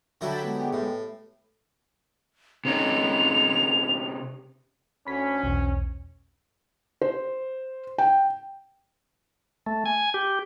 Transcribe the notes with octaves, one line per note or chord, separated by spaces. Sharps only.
D3 F#3 E4 G5 A5 B5
G#3 B3 G4
A2
C3 C#4 D#4 F7
D2 C#4 B5 B6
B1 E2
C5
G5
A3
G#5
G4